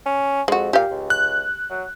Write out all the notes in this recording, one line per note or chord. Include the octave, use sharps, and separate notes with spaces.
C#4
F2 G#3 F#4
A#2 G4 F5
C#2
F#6
F#3